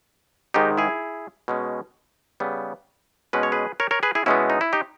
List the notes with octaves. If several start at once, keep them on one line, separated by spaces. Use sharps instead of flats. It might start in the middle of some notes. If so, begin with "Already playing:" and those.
G#2 D#3 G#3 D#4 G4
E4 G#4
B2 G#3 C#4
C#3 G3 B3
B2 G#3 C#4 B4
C#5
G#4 B4
A#4 C#5
A#4 C#5
G#4 B4
E4 G#4
B2 G#3 B3 C#4 E4
D#4
E4
D#4 G4